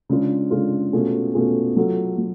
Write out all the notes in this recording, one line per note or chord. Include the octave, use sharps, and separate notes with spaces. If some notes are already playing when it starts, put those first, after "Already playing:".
C#3 G#3 D4 F4
C#3 G#3 D4 F4
B2 A3 C#4 F4 G#4
B2 A3 C#4 F4 G#4
F#3 A3 F4 A4
F#3